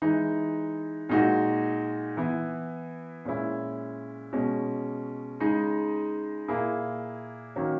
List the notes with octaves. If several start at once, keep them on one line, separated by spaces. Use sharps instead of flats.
E3 G#3 D#4
A#2 G#3 D#4 F#4
E3 B3 E4
A#2 G#3 C#4 E4
B2 G#3 C#4
C#3 G#3 D#4
A#2 A#3 E4 G#4
D#3 F#3 A#3 C#4